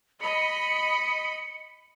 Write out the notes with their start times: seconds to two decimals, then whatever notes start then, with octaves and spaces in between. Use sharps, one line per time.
0.21 D#5 B5 C#7